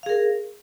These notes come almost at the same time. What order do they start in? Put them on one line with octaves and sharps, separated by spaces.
F5 G#4 A#4